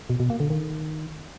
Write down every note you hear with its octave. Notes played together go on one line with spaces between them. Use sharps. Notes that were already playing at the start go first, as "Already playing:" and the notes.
B2
B2
A#3
D3
D#3